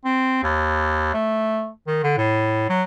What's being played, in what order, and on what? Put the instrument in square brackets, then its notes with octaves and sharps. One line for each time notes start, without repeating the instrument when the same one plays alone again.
[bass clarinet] C4
D#2
A3
D#3
D3
A2
F#3